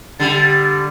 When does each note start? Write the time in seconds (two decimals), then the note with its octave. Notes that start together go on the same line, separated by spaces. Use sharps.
0.20 D3 G3 A6